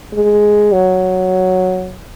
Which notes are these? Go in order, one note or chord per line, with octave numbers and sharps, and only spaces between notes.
G#3
F#3